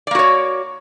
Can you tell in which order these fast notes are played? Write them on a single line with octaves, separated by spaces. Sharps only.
D5 A#3 F#4 C#5